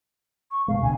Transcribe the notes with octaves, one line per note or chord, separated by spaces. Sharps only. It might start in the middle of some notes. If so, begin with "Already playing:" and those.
C#6
F#1 B2 G#3 F5
C#2 B2 D3 G#5